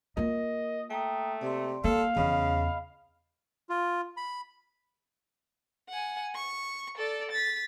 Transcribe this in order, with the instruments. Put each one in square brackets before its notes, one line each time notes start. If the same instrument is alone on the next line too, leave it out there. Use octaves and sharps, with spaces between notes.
[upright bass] A#3 F4 [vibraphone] A#4 [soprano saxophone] D#5
[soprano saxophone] A3 [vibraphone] G5 A#5 D#6
[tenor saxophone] C3 [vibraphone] D5 C6
[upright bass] A#3 [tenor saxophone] A4 [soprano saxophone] F5
[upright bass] E2 [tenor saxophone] C#3 [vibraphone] D#5 B5
[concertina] F4
B5
[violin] F#5 G#5
C#6
A4 D5
A6 B6